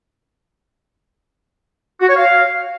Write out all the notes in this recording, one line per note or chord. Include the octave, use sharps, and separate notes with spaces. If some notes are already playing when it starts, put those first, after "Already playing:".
F#4
C#5
F5